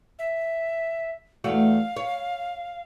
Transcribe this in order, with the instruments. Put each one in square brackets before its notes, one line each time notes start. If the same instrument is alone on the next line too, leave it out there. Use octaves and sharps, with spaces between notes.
[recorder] E5
[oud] E2 A3 F#4 [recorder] F5
[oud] C#5